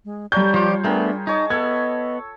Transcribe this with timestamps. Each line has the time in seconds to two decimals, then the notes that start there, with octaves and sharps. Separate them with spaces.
0.05 G#3
0.32 G3 C#5 D5 A5 A#5 G6
0.54 F3 F4 G4
0.84 A3 B3 D4 G#4 A#4 G5
1.27 D#4 G#4 C#5 D#5 A5
1.50 B3 A4 E5 G#6